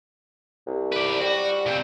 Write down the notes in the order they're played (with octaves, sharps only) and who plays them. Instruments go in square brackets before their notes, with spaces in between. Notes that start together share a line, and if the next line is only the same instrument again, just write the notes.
[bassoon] C2
[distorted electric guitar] B4 D5
[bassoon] G3 [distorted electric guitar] F#4
[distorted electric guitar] A#2 C4